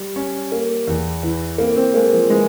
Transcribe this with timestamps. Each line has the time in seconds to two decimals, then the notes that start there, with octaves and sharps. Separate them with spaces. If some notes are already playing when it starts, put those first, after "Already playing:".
Already playing: G3
0.16 C#4
0.52 A#3
0.87 E2
1.23 E3
1.58 A#3 C4
1.76 C4
1.94 G#3 A#3
2.13 F3
2.30 E3 G#3